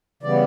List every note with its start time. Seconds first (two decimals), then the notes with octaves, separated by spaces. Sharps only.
0.23 C#3 E3 G3 B3 D5